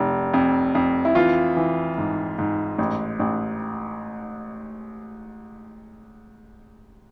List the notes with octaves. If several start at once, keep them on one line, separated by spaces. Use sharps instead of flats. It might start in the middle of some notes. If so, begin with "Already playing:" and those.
Already playing: F1
F2
F2
E4
E3 F4
E3
G#2
G#2
A1
A1